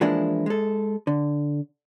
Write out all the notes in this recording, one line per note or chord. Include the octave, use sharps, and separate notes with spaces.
E3 F3 G#3 A#3 D4 E4
G#3 A4
D3